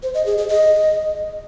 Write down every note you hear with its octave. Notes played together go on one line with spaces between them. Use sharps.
C5
D#5
G#4
G#4
D#5